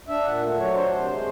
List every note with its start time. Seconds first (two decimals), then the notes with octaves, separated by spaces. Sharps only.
0.08 D4 E5
0.25 A#2 F#5
0.41 A3
0.58 F#3 C#5
0.74 D4 C5
0.91 C3
1.08 G#3